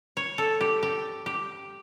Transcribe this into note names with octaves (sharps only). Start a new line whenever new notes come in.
C#5
A4
G4
G4
G4